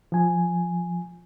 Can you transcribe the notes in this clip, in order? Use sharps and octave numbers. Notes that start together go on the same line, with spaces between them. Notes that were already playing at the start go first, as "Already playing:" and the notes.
F3 G#5